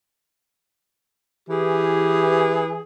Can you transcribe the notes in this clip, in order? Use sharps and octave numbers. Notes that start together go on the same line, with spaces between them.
E3 G4 G#4